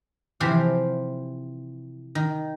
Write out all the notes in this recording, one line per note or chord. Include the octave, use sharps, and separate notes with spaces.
C3 E3 F3 G4 C5 F5
D#3